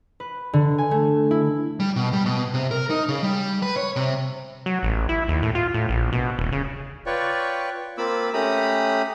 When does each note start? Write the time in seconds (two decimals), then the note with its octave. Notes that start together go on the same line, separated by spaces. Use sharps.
0.20 B4
0.53 D3
0.78 G#5
0.91 A3
1.31 E4
1.80 G3
1.96 B2
2.13 G3
2.26 B2
2.54 C3
2.71 A#4
2.90 D#4
3.09 C#3
3.23 G3
3.62 B4
3.76 C#5
3.96 C3
4.66 F#3
4.83 A1
5.09 E4
5.28 D#2
5.42 A2
5.55 F4
5.74 A2
5.89 A#1
6.13 B2
6.39 D#1
6.52 C#3
7.06 F4 B4 C#5 D5 G5 C#6
7.98 A#3 C4 F4 B5 D6 E6
8.33 A3 C#4 G4 A#5 B5 D#6